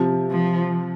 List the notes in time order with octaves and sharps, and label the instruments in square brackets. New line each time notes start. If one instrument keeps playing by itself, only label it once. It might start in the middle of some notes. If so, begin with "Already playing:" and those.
Already playing: [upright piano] C3 F3
[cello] F3